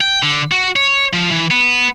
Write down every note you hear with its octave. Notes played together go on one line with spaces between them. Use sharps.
G5
D3
F#4
C#5
F3
E3
B3